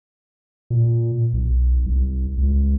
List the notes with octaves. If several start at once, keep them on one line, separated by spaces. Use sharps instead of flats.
A#2
B1
C2
C#2